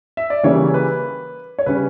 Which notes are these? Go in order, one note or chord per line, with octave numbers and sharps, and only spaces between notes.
E5
D5
C#3 E3 G3 A#3 C#4 C#5
B4
C#5
C#3 G3 C#4 B4